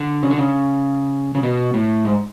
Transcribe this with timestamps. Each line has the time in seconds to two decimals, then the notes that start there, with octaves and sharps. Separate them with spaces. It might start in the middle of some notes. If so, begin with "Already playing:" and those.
Already playing: D3
0.23 C#3
0.30 D3
0.38 C#3
1.35 C#3
1.43 B2
1.74 A2
2.05 G#2